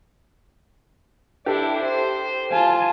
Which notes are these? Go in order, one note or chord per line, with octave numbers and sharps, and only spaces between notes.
D4 E4 G4 A4
C5
F4 G#5 A5